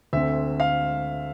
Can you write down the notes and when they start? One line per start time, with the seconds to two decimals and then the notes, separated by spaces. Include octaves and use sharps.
0.13 D2 D3 A3 C4 E5
0.60 F5